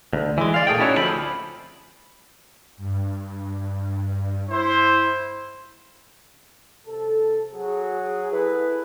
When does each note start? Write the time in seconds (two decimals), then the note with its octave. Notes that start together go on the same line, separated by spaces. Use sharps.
0.13 D2
0.38 E3 G#3
0.54 D5 F5
0.67 A#2 A3 G#4 D5 G5
0.79 C#4 D#4 E4 F#4 C#5
0.97 D2 D3 F3 C4 F4 B5
2.77 G2
4.49 E4 C5
6.87 C3 A4
7.53 F#3 F#4 G#4
8.32 E4 G#4 A4 B4